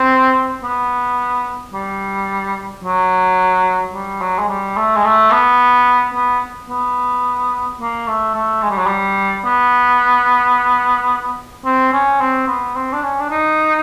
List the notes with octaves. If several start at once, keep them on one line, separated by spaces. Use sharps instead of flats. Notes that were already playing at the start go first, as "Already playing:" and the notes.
Already playing: C4
B3
G3
F#3
G3
F#3
G#3
G3
A3
G#3
A3
B3
B3
B3
A#3
A3
A3
G#3
G3
F#3
G3
B3
C4
C#4
C4
B3
C4
D4
C#4
D4
D#4